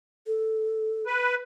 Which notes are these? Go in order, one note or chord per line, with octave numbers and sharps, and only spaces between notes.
A4
B4